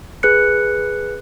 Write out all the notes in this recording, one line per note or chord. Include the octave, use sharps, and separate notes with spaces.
G#4 B4 F#6 C#7